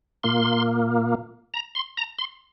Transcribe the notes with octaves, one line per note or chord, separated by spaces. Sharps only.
A#2 A#3 C6
A#5
C6
A#5
C6